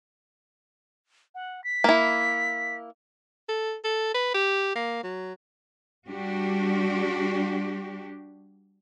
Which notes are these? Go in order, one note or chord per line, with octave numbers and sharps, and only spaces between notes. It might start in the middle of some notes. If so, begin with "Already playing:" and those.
F#5
B6
A#3 E4
A4
A4
B4
G4
A#3
F#3
G3 D4 F#4 G4